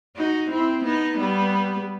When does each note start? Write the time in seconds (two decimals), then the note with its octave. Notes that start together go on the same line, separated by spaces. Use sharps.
0.16 D#4 F#4
0.51 C4 E4
0.84 B3 D#4
1.17 G3 B3